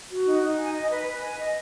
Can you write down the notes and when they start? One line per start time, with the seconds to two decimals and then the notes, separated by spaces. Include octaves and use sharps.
0.10 F#4
0.26 D#4
0.42 D#4
0.58 G#5
0.74 D#5
0.90 B4
1.07 B4
1.22 G#5
1.38 D#5